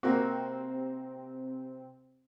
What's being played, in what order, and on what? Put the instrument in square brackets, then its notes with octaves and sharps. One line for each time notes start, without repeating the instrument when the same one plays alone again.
[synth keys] C3 C4 [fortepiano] A#3 F#4